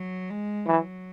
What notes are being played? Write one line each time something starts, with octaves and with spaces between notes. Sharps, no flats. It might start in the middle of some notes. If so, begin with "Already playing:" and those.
Already playing: F#3
G#3
E3 F#3